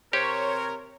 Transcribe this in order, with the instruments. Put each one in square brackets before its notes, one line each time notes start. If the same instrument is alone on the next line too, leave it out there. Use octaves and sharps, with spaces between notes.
[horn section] C3 A#4 [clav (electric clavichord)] G4 [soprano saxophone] C5 [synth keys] C#5